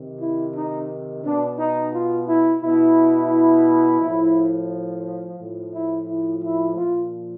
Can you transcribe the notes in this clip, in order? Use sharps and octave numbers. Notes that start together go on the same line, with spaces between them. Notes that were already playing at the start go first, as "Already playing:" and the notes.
Already playing: C3 D#3
E4
D#4
B2 D4
D#4
F4
E4
B2 E4
A2 F3
A2 F3
E4
E4
E4
A#2 F3 F4